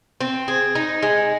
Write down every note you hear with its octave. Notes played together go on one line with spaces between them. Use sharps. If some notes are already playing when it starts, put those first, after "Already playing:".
C4
G#4
D#4
G#3